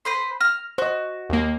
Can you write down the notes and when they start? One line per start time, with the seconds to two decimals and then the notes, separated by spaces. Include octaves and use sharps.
0.05 B4 C5 C6
0.41 F6 A#6
0.78 F#4 C5 D#5
1.29 D#2 A#3